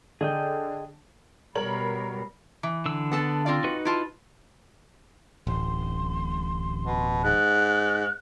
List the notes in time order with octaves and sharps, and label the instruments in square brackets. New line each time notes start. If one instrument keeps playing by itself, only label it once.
[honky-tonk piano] D3 [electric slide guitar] G#4 D#5 G5
[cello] B2 G3 [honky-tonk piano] A#4 C#5 F#7
[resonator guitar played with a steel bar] E3
[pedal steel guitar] D3 E6
[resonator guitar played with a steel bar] B3 A4 A5
C4 F4 D5
[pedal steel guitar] D#4 F#4 B4
[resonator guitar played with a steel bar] E4 F4 A5
[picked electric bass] D1 A1 [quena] C6
[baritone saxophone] B2
[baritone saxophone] G#2 [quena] F#6